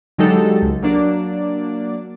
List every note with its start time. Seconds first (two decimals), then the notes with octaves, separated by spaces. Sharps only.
0.18 D3 F#3 G#3 D#4 G4 A4
0.62 C#2
0.82 F#3 A#3 D4 D5